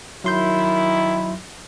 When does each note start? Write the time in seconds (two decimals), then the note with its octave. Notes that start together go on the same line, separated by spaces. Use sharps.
0.24 D#3 F#3 E4 C6 G6